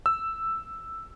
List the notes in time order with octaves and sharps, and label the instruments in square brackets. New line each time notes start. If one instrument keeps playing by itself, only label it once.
[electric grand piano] E6